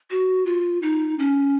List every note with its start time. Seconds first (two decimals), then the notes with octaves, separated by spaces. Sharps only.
0.11 F#4
0.46 F4
0.82 D#4
1.19 C#4